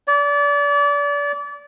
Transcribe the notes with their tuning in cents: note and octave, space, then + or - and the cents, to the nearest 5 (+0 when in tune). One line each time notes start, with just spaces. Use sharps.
D5 -30